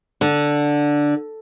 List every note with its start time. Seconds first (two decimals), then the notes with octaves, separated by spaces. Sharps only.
0.21 D3